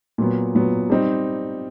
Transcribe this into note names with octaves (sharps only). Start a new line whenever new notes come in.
A#2 F#3 B3
A#2 F#3 B3
G3 C4 D#4